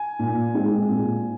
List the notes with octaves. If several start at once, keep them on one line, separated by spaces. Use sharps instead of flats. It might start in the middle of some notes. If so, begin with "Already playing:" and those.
Already playing: G#5
A#2
G#3 C4
A#2